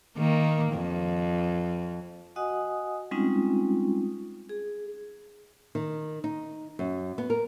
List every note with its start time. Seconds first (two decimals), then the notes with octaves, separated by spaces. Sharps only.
0.17 D#3 A#3
0.73 F2
2.36 F#4 D#5 F#5 G#5 D#6
3.11 G3 G#3 C4 C#4 D#4 F4
4.49 G#4
5.75 D#3
6.24 D#4
6.79 F#2
7.18 B3
7.30 A#4